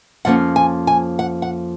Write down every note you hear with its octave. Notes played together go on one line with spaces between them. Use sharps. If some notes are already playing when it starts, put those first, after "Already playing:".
F2 F3 A#3 C#4 F#5
G#5
G#5
F#5
F#5